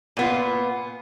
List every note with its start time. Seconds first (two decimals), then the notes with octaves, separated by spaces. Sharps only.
0.17 A#2 B3 F4